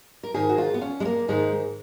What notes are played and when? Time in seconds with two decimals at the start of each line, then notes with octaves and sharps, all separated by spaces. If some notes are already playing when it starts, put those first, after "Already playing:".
0.23 A#4
0.34 G#2 D#3 G#4
0.49 F#4
0.58 F4
0.74 B3
0.82 C#4
1.00 G#3
1.05 A#3
1.28 G#2 D#3 G#3